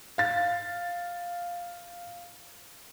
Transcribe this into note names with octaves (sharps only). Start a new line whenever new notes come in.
F5 A6